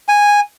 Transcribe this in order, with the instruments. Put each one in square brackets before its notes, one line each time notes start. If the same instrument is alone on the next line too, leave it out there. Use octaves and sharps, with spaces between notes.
[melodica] G#5